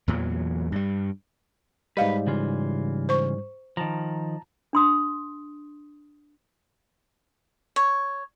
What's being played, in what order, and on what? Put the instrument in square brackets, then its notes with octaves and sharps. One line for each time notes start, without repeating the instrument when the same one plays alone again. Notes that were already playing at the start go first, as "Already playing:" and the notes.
[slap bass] E2 A#2 E3 F#3
G2 G3
[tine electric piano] G#2 G3 [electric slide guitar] B4 [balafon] D#5 F5
[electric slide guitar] C#3 E3 F4
[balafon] C5 C#6
[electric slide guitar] D#3 F3 [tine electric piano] A5 A#5
[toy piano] D4 C6 D#6
[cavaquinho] C#5